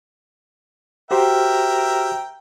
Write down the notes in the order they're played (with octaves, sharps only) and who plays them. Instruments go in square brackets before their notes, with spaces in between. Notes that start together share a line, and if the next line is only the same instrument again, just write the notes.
[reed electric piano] F#4 G4 C5 [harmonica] A#4 E5 G5